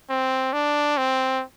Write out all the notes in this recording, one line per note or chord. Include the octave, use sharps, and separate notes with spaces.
C4
D4
C4